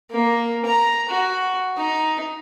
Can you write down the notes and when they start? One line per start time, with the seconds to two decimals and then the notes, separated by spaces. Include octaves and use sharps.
0.12 A#3
0.66 A#5
1.09 F#4
1.77 D#4